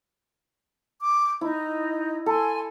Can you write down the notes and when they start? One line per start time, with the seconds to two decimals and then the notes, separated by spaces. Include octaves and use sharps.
1.00 D6
1.41 D#4 E4 D#5
2.26 A4 G#5 C6